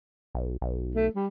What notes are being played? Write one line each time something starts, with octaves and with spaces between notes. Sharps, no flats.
B1
B1
A3
G3